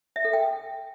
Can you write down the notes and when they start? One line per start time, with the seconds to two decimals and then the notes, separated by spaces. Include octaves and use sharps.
0.16 E5
0.25 A4
0.33 G5